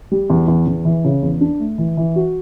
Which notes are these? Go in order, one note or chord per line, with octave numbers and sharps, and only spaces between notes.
G3
E2
E2
E2
E3
C#3
E2
D4
A3
E3
E3
F#4